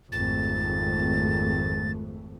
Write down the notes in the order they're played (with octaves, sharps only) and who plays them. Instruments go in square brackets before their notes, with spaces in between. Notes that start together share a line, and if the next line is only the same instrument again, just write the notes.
[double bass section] G#1 F2 A3 [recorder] A6